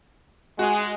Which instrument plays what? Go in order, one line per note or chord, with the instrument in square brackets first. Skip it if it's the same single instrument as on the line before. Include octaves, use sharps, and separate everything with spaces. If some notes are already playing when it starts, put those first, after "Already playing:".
[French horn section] G#3 [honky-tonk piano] F#4